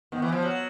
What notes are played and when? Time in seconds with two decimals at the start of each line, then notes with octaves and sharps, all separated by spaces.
0.12 D#3 B3
0.22 E3
0.32 F3
0.42 F#3